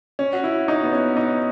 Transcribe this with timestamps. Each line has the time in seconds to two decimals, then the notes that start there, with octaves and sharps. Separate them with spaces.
0.19 C#4
0.33 F#4
0.44 E4
0.68 D#4
0.84 B3
0.93 C#4
1.17 D#4